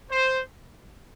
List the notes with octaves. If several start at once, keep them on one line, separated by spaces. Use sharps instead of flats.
C5